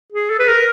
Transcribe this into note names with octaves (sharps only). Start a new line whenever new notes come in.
G#4
A4
B4
A#4